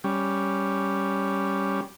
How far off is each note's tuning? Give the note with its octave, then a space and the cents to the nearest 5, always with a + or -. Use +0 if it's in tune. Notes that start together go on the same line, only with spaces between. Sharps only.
G3 +0 C#4 +5